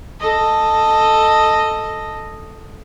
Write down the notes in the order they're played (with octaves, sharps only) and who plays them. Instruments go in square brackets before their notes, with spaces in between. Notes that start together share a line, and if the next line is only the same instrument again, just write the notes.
[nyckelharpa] A4 D#5